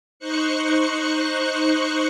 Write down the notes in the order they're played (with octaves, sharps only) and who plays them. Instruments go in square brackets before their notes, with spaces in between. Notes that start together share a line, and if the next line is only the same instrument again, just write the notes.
[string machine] D#4 C5 C#6 F#6 C#7